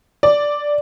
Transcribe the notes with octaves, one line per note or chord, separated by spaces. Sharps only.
D5